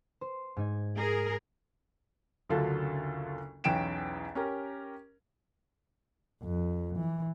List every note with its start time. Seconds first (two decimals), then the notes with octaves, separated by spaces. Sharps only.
0.21 C5
0.57 G#2 D#4 G#6
0.96 G#4 A#4
2.49 F#1 D2 D3 F#3 F4 A4
3.64 B1 E2 C#4 G5 D7 E7
4.35 C#4 G4 A#4
6.43 F2
6.97 E3